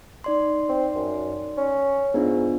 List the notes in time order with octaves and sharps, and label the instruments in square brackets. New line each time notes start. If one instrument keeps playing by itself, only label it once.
[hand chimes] D#4 D5 C6
[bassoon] C4
F#2
C#4
[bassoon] G#2 [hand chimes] B3 D4 F4